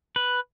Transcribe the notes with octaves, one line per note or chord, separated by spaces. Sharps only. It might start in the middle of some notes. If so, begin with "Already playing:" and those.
B4